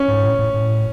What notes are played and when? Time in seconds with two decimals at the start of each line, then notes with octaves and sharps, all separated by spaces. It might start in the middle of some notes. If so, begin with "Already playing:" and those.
Already playing: C#4
0.08 G#2
0.24 A2
0.39 A2
0.54 A2